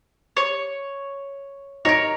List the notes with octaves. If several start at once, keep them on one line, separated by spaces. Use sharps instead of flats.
C#5
D#4 A#4 C#5 A#6